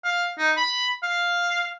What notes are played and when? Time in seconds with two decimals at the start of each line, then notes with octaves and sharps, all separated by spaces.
0.04 F5
0.38 D#4
0.57 B5
1.03 F5